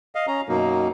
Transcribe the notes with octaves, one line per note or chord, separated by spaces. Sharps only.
D#5 F5
C#4 A#5
F#2 B2 F#3 A#3 D#4